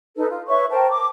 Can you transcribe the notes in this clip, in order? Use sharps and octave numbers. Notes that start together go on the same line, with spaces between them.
D#4 A4 B4
F4
B4 C#5 E5 C#6
A#4 C5 G5 A5
D6